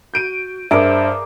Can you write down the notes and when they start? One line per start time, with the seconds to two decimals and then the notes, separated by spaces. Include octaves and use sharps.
0.14 F#4 G6 D7 D#7
0.71 G2 G#4 A#4 C5 D5 E5 D7